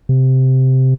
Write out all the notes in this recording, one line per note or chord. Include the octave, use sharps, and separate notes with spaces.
C3